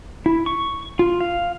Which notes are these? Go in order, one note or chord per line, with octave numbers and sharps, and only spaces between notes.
E4
C#6
F4
F5